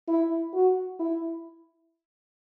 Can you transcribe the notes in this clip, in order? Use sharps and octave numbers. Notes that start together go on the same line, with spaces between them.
E4
F#4
E4